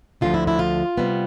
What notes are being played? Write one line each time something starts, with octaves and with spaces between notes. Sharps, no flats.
D2 D3 F3 F4
E4
E4
F4
C3 G3 B3